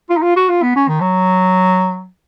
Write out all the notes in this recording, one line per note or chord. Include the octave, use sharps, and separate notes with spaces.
F4
D#4
F4
F#4
F4
B3
C#4
D#3
F#3